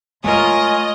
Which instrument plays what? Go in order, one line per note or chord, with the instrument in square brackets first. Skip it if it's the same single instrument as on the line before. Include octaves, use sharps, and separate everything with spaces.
[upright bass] G#3 A3 [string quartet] F4 A#4 C#5 [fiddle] D#5 [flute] G#5